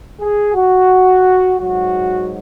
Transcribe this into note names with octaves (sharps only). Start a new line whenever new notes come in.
G#4
F#4
G#2 F#3 F#4